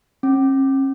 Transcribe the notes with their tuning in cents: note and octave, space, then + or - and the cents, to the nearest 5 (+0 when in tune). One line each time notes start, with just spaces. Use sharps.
C#4 -45